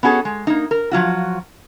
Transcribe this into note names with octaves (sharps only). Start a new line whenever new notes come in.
B3 C#4 F#4 G#4 A4
G#3
A#3 D#4
A#4
F3 F#3 F4 F#4